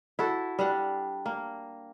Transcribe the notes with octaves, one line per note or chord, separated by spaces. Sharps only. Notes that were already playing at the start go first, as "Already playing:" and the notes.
E4 F#4 A4
G3 D4 F#5
A#3